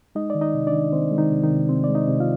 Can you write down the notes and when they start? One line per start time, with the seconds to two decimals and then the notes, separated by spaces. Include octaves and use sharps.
0.15 G#3 D#4 D#5
0.30 D#3 D5
0.41 D#4 D#5
0.54 C3
0.67 D4 D5
0.73 D#3
0.92 D#3 C4 C5
1.11 G#3
1.18 D#3 D#4
1.31 C3
1.44 D#3 D#4
1.50 C3
1.69 C3 C4 C5
1.84 G#3 D5
1.95 D#4 D#5
2.08 C3
2.20 F4 F5